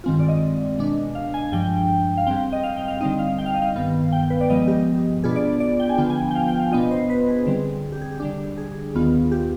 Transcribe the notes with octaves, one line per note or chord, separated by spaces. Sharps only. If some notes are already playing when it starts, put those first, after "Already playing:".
G2 D#3 G#3 C4 F4
D5
D#5
B2 G#3 D4
F5
G#5
G#5
G2 F3 G#3 D4 G5
F5
G#2 G3 C4 G5
D#5
F5
G5
F5
D3 G3 C4 D#4 D#5
F5
G5
F5
D#5
F5
G2 D#3 B3
G5
B4
D5
G2 F3 G#3 B3 D#5
G4
B2 B3 D4 F4 G#4
D5
D5
D5
G5
G#5
D3 F3 B3 D4 F4 G5
G#5
G5
F5
G5
F5
B2 B3 D4 F4 D#5
C5
B4
G#4
D3 G3 C4
G4
G#4
G4
D3 G3 D4
G#4
D#2 D#3 B3 F4
G4